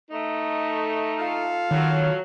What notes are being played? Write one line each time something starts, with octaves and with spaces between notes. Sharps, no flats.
A3 D#4
F4 A4 F5
D#3 F#3